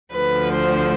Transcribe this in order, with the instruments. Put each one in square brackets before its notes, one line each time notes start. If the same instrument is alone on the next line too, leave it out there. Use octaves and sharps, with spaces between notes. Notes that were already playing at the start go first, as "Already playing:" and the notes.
[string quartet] D2 D3 F3 B4
C5